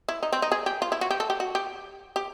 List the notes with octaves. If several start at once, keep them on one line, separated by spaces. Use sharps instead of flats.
E4
D#4
C4
D#4
G#4
G4
F4
E4
F#4
G4
A4
G4
F#4
G4
G4